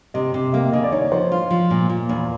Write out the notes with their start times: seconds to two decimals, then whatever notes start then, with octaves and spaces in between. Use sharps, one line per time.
0.14 C3 D#5
0.34 C3
0.53 A#3 E5
0.73 C#3 D#5
0.83 D5
0.92 D#4 C#5
1.12 F3 C5
1.32 F4
1.51 F3
1.70 A#2
1.90 A#2
2.09 E2